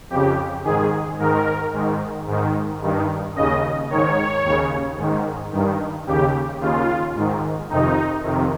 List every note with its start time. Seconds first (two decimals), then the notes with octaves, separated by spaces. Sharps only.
0.10 F2 C#3 G4
0.64 G#2 D#3 G#4
1.18 G#2 D#3 A#4
1.73 G#2 D#3
2.27 G#2 D#3
2.82 G2 D#3
3.36 D#2 C#3 D#5
3.90 G#2 D#3 C#5
4.44 D#2 C#3
4.98 G#2 D#3
5.52 G2 D#3
6.07 D#2 C#3 G4
6.61 D#2 C#3 F4
7.16 G#2 D#3
7.70 F2 C3 D#3 D#4
8.24 F2 C3 D#3